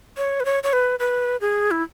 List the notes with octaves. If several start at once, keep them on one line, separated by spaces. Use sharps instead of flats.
C#5
B4
C#5
C#5
B4
B4
G#4
E4